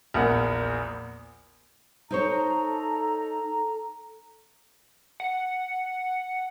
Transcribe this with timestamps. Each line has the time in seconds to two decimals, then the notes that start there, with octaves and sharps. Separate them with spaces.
0.14 A#1 E2 A#4 F#5
2.11 D#4 A4 C5 C#5 A#5
5.20 F#5